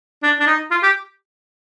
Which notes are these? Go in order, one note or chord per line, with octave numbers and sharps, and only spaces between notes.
D4
D4
D#4
F4
G4